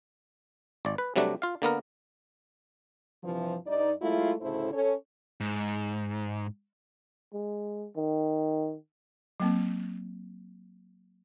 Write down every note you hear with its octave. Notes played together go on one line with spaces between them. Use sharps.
G#1 D5
B4
C3 F#3 G3 A3 D4
F4 F5
D3 A#3 B3 A#4
G2 C3 E3 F3
G2 D#4 D5
F#3 G#3 A3 E4 F4
D2 A2 C#3 E4 A4 C5
C#4 A4 C#5
G#2
G#3
D#3
F#3 A#3 C4